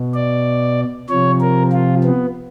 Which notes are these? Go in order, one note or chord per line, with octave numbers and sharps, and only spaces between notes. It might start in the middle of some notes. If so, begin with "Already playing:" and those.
Already playing: B2
D5
C3 F3 C#5
A#4
F4
B3